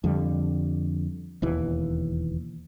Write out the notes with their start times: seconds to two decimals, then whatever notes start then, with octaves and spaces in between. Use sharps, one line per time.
0.04 F2 D3 G3
1.42 E1 D#2 E3